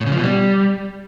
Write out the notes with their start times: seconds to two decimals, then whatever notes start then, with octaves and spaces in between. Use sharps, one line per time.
0.01 A2
0.06 C#3
0.12 F3
0.18 B2
0.23 G3